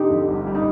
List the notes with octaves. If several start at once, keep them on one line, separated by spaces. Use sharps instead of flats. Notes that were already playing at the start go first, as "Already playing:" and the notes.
Already playing: D3 D#4 G4
F2
G1
G3
D#4